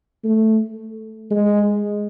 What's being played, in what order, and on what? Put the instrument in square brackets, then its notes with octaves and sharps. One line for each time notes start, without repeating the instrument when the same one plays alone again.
[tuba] A3
G#3